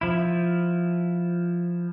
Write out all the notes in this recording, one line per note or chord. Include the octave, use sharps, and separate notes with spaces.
F3 E4